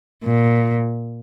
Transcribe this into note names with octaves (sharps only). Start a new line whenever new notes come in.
A#2